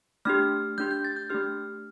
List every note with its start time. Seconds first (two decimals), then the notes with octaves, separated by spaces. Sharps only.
0.25 A3 D4 G4 F6
0.78 A3 D4 G4 G6
0.91 G6
1.04 A6
1.16 G6
1.30 A3 D4 G4 F6